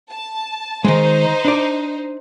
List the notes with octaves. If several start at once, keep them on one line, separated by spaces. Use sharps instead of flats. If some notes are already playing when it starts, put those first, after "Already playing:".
A5
D#3 G#3 D#4 C5
D4 D5